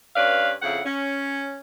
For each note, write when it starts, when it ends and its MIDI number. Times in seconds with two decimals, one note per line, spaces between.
0.16 0.52 43
0.16 0.52 61
0.16 0.52 71
0.16 0.52 74
0.16 0.52 77
0.62 0.80 41
0.62 0.80 49
0.62 0.80 64
0.62 0.80 78
0.86 1.60 61